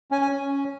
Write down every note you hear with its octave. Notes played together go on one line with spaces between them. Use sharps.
C#4 G#5
G#5
C#4